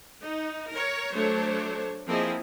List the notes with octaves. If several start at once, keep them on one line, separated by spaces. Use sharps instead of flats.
D#4
A#4 C#5
F#3 A3 D4 C5 C#5
F3 A#3 C4 E4 G#4 D#5